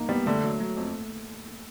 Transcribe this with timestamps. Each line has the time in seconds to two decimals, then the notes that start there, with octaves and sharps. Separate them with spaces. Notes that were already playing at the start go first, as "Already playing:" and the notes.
Already playing: A#3 D#4
0.09 G3 B3
0.26 D3 A3
0.44 F#3
0.60 F#3
0.77 F2